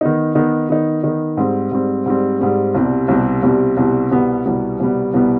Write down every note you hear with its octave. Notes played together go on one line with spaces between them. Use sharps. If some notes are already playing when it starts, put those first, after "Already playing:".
D#3 B3 D#4
D#3 B3 D#4
D#3 B3 D#4
D#3 B3 D#4
G#2 G3 C4
G#2 G3 C4
G#2 G3 C4
G#2 G3 C4
C2 B2 G3 C4
C2 B2 G3 C4
C2 B2 G3 C4
C2 B2 G3 C4
C2 B2 G3 B3
C2 B2 G3 B3
C2 B2 G3 B3
C2 B2 G3 B3